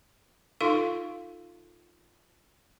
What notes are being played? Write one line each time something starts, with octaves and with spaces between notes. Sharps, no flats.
D#4 F4 A4 F5 C6